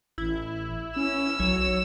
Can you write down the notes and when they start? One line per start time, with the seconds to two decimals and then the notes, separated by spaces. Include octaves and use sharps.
0.18 A1 E4
0.96 C#4 E6
1.40 B1 F#3 C#5